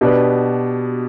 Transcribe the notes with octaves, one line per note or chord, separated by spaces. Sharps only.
B2 B3 D4 G4 B4